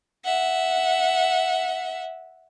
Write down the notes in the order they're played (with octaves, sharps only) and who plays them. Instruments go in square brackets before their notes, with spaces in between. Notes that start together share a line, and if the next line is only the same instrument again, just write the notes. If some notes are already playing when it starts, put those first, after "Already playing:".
[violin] E5 F#5